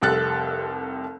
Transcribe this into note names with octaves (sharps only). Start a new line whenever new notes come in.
F1 C2 G4 A4 F#6 A6